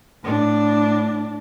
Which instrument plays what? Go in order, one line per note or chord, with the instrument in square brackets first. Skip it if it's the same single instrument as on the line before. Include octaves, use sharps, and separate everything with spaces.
[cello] A2 D4